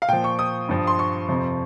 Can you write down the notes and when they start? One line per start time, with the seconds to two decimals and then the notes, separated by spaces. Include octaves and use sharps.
0.02 F5
0.08 A#2 F3 G5
0.24 C#6
0.39 D#6
0.69 G2 F3
0.87 C6
0.99 C#6
1.29 F2 C3 F3